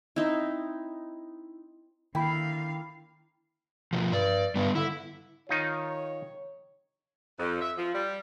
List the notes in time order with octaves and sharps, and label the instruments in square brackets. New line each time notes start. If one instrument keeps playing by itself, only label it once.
[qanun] C4 D#4 E4
[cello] D3 F5 [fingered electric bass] D#3 [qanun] A#3 E4 [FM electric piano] G5 B5
[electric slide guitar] B2 F3
[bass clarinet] G2 [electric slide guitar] D5
[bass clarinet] G2 [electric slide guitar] G3 B3
[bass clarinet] D3 [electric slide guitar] E4
[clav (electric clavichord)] D#3 D#4 F4 [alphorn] C#5
[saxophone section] F2
E5
F3
G3